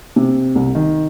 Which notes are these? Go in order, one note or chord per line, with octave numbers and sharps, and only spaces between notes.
C3
C2
D#3